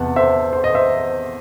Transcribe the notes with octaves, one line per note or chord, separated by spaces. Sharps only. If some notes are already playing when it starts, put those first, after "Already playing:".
Already playing: E2 C3 E3 B3 F#5 A5
C5 E5
C5
D#5
C5 E5